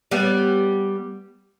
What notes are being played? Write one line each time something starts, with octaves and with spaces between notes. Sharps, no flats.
G3 B3